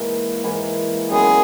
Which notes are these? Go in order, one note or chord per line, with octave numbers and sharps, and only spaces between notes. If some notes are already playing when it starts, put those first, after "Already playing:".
Already playing: G#2 E3 A#3
G#2 E3 A#3
F#2 D#3 G#3 B3 G#4